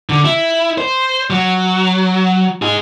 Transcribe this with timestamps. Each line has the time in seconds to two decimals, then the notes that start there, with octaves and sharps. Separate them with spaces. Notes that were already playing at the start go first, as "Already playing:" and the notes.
0.10 D3
0.25 E4
0.78 C5
1.30 F#3
2.62 D#4 G#4